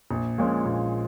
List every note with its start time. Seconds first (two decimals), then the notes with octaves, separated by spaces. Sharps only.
0.11 A#1
0.38 A#2 F3 G#3 C#4
0.66 A#1